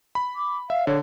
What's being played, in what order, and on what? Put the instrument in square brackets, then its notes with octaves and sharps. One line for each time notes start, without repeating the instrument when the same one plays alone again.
[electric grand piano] B5
[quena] D6
[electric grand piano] E5 [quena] F5
[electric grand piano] D3 [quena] C#5